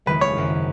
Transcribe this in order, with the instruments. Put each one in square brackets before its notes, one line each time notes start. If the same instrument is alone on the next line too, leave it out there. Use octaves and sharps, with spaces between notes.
[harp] F#1 E2 D#3 G#3 [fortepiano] B4
[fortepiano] C#5
[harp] G#1 F#2 C#3